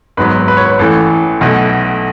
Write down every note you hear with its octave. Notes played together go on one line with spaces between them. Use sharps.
G#1 G#2 F#3 B3 B4
B4
C#5
B4
A1 A2 E3 A4
B1 B2 A3